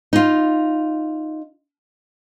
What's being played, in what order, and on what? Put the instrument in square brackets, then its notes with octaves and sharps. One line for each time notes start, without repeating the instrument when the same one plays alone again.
[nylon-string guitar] D#4 F4